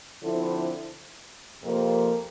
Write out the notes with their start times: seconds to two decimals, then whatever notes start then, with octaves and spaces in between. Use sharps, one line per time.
0.21 D3 F3 C4 E4
1.62 F2 C3 F3 A#3